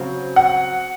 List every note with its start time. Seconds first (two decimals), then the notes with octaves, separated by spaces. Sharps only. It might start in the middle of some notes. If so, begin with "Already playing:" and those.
Already playing: C#3 F#3 C4
0.36 F#5